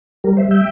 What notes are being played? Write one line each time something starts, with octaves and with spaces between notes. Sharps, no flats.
G3 G4 A#4
C5 E5
G3
E5 G5